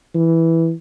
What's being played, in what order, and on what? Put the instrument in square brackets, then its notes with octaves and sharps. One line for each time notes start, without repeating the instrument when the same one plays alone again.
[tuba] E3